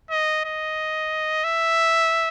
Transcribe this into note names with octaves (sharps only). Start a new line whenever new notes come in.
D#5
D#5
E5